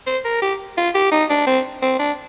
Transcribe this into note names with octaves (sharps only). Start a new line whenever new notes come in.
C5
A#4
G4
F4
G4
D#4
D4
C4
C4
D4